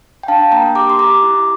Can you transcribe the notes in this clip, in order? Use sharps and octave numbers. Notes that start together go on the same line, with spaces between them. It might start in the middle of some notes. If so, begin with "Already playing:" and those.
G5
D4 F5 A5
A#3 G5 A#5
G4 A#5 D6
C6
G4 A#5 D6
E4